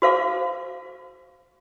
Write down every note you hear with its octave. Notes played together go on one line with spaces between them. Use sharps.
F#4 C5 F5 D6